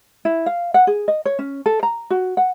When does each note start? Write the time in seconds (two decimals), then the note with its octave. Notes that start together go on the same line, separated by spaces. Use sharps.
0.25 E4
0.46 F5
0.74 F#5
0.87 G#4
1.08 D#5
1.25 C#5
1.39 C#4
1.66 A4
1.83 A#5
2.10 F#4
2.37 F#5